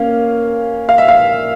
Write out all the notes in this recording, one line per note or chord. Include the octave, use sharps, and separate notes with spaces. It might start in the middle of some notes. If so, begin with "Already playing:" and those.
Already playing: A#3 C#4 F5
F5
E5
F5